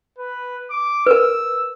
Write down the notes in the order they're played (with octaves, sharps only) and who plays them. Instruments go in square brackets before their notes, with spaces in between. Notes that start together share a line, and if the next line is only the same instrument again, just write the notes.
[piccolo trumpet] B4
D6
[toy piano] A#4 B4 [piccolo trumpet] E6